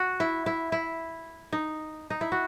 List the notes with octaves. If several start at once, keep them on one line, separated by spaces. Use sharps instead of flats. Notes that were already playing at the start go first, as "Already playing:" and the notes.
Already playing: F#4
E4
E4
E4
D#4
D#4
E4
F#4